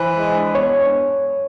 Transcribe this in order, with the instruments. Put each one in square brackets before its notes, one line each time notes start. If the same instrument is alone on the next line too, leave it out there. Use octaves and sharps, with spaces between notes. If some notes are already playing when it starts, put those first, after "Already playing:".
Already playing: [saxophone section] E3 [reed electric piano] C5
[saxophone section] G#3
D4
[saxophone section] B3 [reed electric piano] C#5